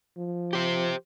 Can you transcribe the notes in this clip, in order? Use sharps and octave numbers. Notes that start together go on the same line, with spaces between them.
F3
G4 C5